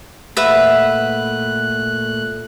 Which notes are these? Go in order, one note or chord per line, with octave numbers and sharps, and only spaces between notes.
A#2 A3 B4 E5 F#5 F#6